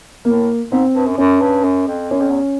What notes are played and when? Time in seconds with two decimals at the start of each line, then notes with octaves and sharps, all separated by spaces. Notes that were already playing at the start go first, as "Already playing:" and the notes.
0.25 A2 A#3
0.71 G#2 C4
0.95 G2
1.07 F#2
1.17 F#2 C#4
1.42 G2
1.64 F#2
1.88 F2
2.11 F#2 C#4
2.21 F2
2.30 E2